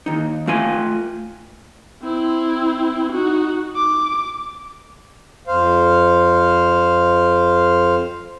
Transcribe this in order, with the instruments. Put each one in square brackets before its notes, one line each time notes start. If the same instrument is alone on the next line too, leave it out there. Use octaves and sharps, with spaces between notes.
[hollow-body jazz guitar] D#2 D#4
A3 F4 G#5
[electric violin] C4 E4
D#4 F#4
D6
[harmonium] F2 C5 F5